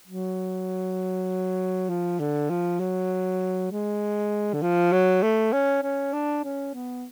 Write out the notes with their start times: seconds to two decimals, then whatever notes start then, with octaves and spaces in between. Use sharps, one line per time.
0.08 F#3
1.89 F3
2.20 D3
2.50 F3
2.80 F#3
3.71 G#3
4.53 D3
4.62 F3
4.92 F#3
5.23 A3
5.53 C#4
5.83 C#4
6.13 D4
6.44 C#4
6.74 B3